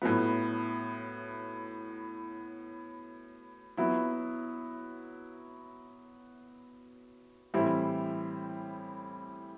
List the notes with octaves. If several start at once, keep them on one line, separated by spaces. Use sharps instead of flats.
A2 F#3 B3
F#3 B3 E4
A2 E3 G3 C4 E4